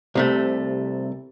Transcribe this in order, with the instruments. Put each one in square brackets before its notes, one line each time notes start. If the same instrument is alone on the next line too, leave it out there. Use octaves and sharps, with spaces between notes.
[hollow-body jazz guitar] C2 C3 A3